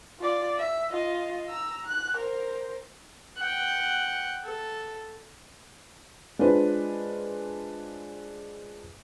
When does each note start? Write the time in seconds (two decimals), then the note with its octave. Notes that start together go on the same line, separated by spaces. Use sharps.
0.20 F4 D5
0.58 E5
0.91 F4 D#5
1.48 A#5 E6
1.86 F#6
2.18 A#4 C5
3.38 F#5 G5
4.45 A4
6.39 G#3 D4 F4 B4 C5